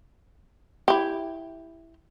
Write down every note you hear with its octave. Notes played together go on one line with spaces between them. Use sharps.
E4 G4